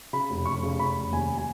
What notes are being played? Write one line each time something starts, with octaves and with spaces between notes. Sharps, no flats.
C#3 B5
F1
F1 C#6
C#3
F1 B5
F1
D#2 G#5
G#5